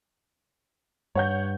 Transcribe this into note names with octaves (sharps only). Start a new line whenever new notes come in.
G2 C#5 F#5 G6